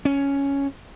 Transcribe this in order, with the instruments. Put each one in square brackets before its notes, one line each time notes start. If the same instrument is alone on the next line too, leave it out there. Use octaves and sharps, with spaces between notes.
[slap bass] C#4